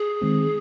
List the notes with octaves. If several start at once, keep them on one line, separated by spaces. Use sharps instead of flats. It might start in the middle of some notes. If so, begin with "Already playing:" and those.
Already playing: G#4
D#3 G#3 C4